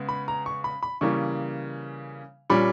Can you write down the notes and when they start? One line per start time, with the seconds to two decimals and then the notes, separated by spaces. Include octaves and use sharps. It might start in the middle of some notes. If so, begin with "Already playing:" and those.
Already playing: C#3 G#3 B3
0.09 B5
0.28 A#5
0.46 C#6
0.64 B5
0.83 B5
1.01 C#3 E3 G3 A#3 C#6
2.50 A#2 G3 C#4 B5